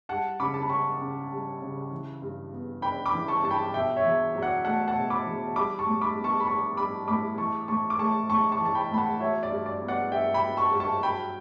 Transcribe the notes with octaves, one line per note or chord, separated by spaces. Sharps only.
G3 F#5 A5
C#3 B5 D6
A5
B5
C#4 A5 C#6
C#3
G3
C#3
E3
G2
B3
D4 G5 B5
B5 D6
E3
A5 C#6
G2 A5
G5 B5
B2 E5 G5
C#5 E5
E2
F#3
D5 F#5
A3 F#5 A5
F#5 A5
B2
B5 D6
E2
G3 B5 D6
A5 C#6
A2
B5 D6
B3
A5 C#6
B5
D4 A5 C#6
G3 B5 D6
A2 B5 D6
E3 A5 C#6
A2 A5 C#6
D6
A3 A5 C#6
A2 A5 C#6
A5 C#6
E3
A5
G5 B5
A2 B5
F#5 A5
F#3 C#5 E5
D5
G2
D5
B3
D5 F#5
G2 E5 G5
G5 B5
F#3
A5 C#6
G2
A5 C#6
F#3 G5 B5